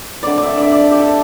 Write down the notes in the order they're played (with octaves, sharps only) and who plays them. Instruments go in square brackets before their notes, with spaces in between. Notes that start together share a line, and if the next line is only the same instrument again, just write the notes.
[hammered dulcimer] D3 A3 C4 D5
D5 E5
D5 E5
D5
A4
G4
A4